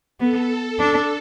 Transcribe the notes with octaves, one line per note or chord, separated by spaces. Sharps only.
B3 A4
D4